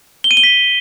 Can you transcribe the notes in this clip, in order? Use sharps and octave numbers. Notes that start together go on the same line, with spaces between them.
G7
D#7
G7
B6